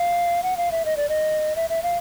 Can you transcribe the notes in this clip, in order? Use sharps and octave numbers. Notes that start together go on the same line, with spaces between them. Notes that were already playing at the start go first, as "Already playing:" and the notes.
Already playing: F5
F#5
F5
E5
D#5
D5
D#5
E5
E5
F5